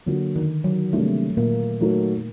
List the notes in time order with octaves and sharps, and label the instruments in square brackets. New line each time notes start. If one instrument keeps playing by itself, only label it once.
[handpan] D3 [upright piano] F#3 A#3 F#4
[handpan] D#3
F#3
[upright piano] C3 G3 A#3 D4 [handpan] A3
[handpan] A#2 A#3
[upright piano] F#3 A3 D#4 F#4 A#4